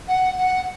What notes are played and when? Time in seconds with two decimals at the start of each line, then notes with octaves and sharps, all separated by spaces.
0.08 F#5
0.38 F#5